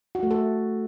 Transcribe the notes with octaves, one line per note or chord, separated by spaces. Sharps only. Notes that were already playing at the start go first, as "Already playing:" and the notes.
F#4
A3
A4